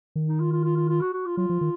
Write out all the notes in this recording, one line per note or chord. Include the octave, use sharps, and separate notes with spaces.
D#3
D#4
F4
F4
F4
F4
F4
F#4
F#4
F4
F#3 F4
F3
D#3